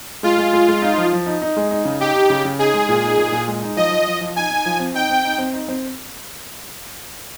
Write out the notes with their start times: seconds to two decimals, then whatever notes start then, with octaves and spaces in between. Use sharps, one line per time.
0.23 G#3 F4
0.38 G#3
0.53 G#3
0.68 G#3
0.82 D#4
0.98 F3
1.13 F3
1.26 D#4
1.42 D#4
1.57 G#3
1.71 D#4
1.85 C#3
2.00 D#4 G4
2.14 D#4
2.30 C#3
2.45 C#3
2.59 D#4 G#4
2.74 G#3
2.89 A#2
3.04 D#4
3.18 A#2
3.32 A#2
3.48 G#3
3.62 D#4
3.77 F3 D#5
3.91 F3
4.07 F3
4.21 F3
4.36 D#4 G#5
4.50 D#4
4.66 F3
4.80 C4
4.94 D#4 G5
5.10 C4
5.24 D#4
5.38 C4
5.53 D#4
5.68 C4